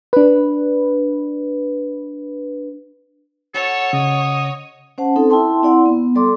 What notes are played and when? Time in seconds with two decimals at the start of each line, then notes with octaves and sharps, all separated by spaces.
0.13 D4 B4
3.54 F#4 A4 C#5
3.93 C#3 D#5
4.98 C#4 C5 F#5 A5
5.16 C4 D#4 A4
5.30 E4 E5 G5 A5 C6
5.62 C4 E4 D5 F#5 C6
5.86 B3
6.15 G3 A4 D5 C6 D6